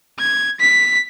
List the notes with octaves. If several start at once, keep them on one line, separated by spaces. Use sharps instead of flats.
G#6
B6